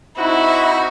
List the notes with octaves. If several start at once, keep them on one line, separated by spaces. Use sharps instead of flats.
C4 D#4 E4 F#4